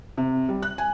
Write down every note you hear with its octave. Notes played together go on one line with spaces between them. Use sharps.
C3
G3
F#6
G#5